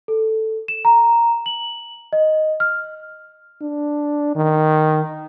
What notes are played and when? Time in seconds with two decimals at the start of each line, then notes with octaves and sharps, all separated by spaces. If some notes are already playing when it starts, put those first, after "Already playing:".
0.08 A4
0.68 E7
0.85 A#5
1.46 F#7
2.13 D#5
2.60 F6
3.62 D4
4.36 D#3